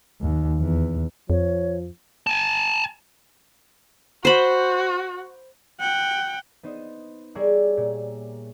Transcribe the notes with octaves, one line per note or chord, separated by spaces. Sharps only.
D#2
E2
F2 F3 C#5
G#5 A5
F#4 C5 B5
F#5 G5
B3 D#4 C5 D#5
G3 G#4 A#4 C#5 D5 E5
A#2